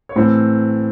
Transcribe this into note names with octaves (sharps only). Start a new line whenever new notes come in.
C#5
A2 E3 C4 C5